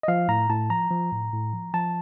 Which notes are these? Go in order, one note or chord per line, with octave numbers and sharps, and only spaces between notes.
D#5
F3 F5
A2 A#5
A2 A5
F3 A#5
F3
A2
A2
F3
F3 A5